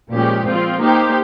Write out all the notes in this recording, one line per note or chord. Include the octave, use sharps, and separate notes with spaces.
A#2 F3 G#3 C#4 G4
F3 C4 F4
A#3 D#4 G4 C5